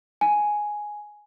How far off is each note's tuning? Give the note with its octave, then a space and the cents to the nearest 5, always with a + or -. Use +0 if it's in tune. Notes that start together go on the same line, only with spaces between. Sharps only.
G#5 +5